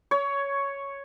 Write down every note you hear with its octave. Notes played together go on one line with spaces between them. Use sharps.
C#5